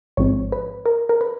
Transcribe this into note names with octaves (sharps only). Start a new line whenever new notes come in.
A1 G#2 F3 G#3 C4 C#5
B4
A#4
A#4
B4